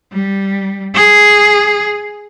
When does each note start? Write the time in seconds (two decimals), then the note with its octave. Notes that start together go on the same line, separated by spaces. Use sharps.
0.12 G3
0.95 G#4